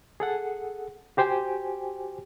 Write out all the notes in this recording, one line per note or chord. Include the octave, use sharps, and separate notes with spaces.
G#4 A4 F#5
F#4 G4 C5 G5 G#5